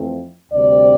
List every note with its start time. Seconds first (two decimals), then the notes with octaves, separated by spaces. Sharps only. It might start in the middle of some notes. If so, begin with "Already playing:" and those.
Already playing: F2 E3 A3
0.50 D2 C3 G3 D5